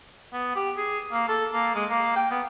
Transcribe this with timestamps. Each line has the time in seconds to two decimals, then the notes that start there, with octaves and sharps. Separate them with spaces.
0.33 B3
0.56 G4
0.78 G#4
1.12 A#3
1.28 A4
1.53 A#3
1.75 G#3
1.90 A#3
2.16 G5
2.31 B3